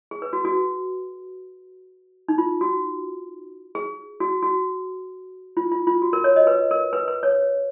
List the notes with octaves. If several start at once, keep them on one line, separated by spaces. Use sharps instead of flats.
G#4
B4
F#4
F#4
D#4
F4
F#4
G#4
F#4
F#4
F4
F4
F4
F#4
A#4
C#5
D#5
B4
A#4
B4
B4
C#5